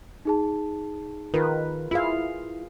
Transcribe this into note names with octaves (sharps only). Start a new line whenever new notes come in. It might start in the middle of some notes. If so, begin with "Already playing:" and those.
D#4 G#4 A5
D#3 F4 A#4 B4
E4 F4 G#4 F5